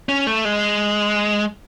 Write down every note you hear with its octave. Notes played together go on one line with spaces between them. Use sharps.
C#4
A3
G#3